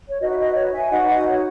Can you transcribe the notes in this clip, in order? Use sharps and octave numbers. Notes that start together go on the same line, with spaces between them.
C#5
D#4 F#4 B4 D#5
E5
D#5
C#5
E5 G#5
D#4 F#4 B4 D#5 F#5
D#5 F#5
C#5